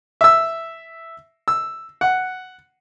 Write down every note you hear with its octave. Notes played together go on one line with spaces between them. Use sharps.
E5 E6
E6
F#5